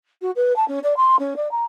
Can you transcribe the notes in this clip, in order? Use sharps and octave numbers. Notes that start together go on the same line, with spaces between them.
F#4
B4
A5
C#4
D5
C6
C#4
D5
A#5